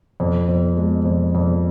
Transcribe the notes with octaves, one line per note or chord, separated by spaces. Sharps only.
F2
F2
G#3
F2
F2